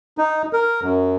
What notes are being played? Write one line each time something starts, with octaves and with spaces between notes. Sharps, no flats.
D#4
A#4
F#2